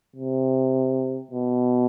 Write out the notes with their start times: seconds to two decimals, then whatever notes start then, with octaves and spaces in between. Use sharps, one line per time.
0.16 C3
1.31 B2